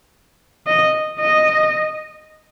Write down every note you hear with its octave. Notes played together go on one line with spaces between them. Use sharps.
D#5
D#5